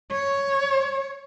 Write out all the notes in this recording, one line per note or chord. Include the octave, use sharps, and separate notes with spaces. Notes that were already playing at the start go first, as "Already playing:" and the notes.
C#5